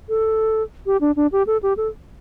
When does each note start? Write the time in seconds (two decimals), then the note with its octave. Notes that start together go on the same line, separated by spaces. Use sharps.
0.09 A4
0.86 G4
1.01 D4
1.16 D4
1.32 G4
1.47 A4
1.63 G4
1.77 A4